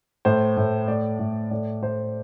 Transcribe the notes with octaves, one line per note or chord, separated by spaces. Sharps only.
A2 C5
A2
A2 D5
A2
A2 D5
A2 C5